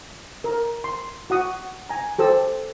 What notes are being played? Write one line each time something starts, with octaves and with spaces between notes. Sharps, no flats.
A#4
C6
F#4 F#5 D#6
G#5 A#5
G4 A4 C5 E6